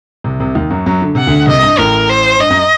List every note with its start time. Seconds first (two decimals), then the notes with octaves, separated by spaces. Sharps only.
0.24 C2 C3
0.40 C2 C3
0.55 D#2 D#3
0.70 F#2 F#3
0.86 F#2 F#3
1.02 D3
1.15 C3 F#5
1.27 D2 D3
1.47 C2 C3 D#5
1.63 G2
1.78 A1 A2 A#4
2.09 C5
2.39 G2 D#5
2.50 F#2